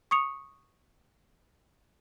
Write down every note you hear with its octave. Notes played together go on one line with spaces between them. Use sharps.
C#6 D#6 C#7 F7